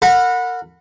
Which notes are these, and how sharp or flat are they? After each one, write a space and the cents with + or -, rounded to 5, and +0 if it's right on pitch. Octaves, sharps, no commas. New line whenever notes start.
A#4 -30 F#5 -25 B5 +0